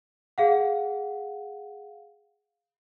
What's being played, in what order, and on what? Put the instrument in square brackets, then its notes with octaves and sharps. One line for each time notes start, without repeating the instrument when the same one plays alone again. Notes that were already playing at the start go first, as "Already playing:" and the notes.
[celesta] G#4 F5 F#5